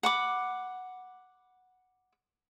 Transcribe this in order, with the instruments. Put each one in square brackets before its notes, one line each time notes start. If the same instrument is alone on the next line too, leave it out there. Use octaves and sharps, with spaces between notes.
[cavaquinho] F#5 B5 D6